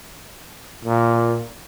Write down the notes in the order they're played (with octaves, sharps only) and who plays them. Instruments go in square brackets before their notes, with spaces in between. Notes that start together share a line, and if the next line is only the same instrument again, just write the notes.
[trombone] A#2